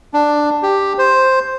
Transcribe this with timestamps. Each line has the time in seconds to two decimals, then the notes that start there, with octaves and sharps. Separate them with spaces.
0.14 D4
0.63 G4
0.98 C5